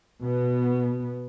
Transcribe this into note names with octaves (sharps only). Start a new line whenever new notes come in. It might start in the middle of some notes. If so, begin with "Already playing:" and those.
B2 B3